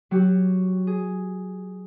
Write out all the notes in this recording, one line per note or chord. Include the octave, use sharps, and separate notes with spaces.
F#3 F#4 G4
G#4